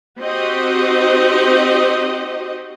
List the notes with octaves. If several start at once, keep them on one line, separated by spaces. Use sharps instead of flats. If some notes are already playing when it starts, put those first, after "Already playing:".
C4 D#4 F#4 G4 D#5